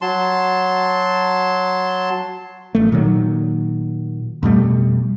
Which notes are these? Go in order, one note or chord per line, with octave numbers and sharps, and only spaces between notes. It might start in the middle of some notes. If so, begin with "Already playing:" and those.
F#3 A5 C6
A1 A3
A#2 D#3 F#3
F2 B2 G3 A3